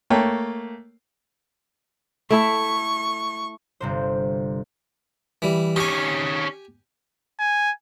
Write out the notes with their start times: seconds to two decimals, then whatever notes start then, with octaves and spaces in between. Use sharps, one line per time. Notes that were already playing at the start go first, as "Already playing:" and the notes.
0.10 A3 A#3 C#5 G5
2.31 A3 E4 A4 C#6
3.80 G1 C3 C5
5.42 E3 G3
5.76 D#3 C#4 G4 G#5
7.40 G#5